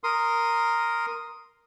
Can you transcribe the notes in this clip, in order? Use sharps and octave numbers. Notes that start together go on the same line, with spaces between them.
A#4 C6 D#6